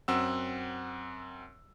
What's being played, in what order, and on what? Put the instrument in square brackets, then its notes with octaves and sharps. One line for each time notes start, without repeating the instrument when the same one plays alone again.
[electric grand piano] F#2 C4 F#5 E6